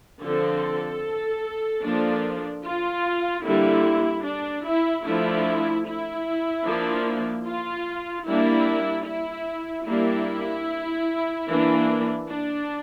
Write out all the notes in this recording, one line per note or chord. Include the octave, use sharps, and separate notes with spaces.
D3 F3 C4 A4
F3 A#3 D4
F4
D3 G3 A#3 E4
D4
E4
F3 A3 D4 E4
E4
F3 A#3 D4
F4
G3 A#3 D4 E4
E4
G3 A#3 D4 E4
E3 A#3 D4
D4